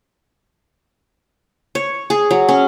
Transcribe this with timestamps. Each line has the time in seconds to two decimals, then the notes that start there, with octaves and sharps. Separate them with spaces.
1.75 C#5
2.10 G#4
2.31 F#3
2.49 C#4